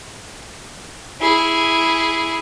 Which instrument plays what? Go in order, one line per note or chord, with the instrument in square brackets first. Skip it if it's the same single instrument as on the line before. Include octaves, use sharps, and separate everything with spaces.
[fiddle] E4 G#4